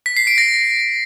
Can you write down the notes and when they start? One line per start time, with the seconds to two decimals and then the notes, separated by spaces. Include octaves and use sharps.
0.06 B6
0.17 C7
0.27 D7
0.38 A#6